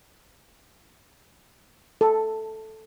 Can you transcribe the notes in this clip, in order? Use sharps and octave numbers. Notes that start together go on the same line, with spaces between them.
A4